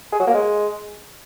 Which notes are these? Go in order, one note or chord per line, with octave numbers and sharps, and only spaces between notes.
G#4
F#3
A#3
G#3